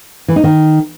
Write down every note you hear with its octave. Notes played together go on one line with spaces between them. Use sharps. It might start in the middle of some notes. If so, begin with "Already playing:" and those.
E3
D#4
D#3